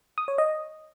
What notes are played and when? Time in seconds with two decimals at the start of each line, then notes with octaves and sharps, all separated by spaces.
0.18 D#6
0.28 C#5
0.38 D#5